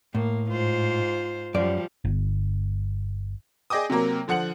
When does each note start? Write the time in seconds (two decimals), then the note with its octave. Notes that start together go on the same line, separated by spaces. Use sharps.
0.15 A2 A#3
0.49 G#2 F4 C5
1.55 F#2 F3 G3 D5
2.05 G1
3.70 G#4 D5 D#5 G5 D6 D#6
3.90 C3 F#3 A#3 A#4
4.28 D3 F3 F#5 C#7 F#7